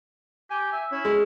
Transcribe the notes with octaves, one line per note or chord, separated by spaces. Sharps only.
G4 G#5
E5
C#4 E4
G#3